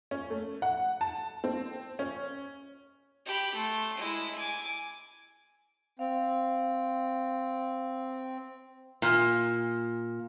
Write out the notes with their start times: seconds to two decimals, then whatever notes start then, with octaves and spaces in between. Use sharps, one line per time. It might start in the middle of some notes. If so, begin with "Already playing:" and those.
0.11 C#4
0.30 A3
0.62 F#5
1.01 A5
1.44 C4
1.99 C#4
3.25 G4 B5
3.55 A3 C6
3.97 G#3 E4
4.35 G#5 D6
5.99 C4 F5
9.02 A#2